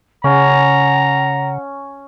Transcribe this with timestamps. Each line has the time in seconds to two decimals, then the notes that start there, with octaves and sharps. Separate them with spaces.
0.24 C#3 C#4 F#5 A#5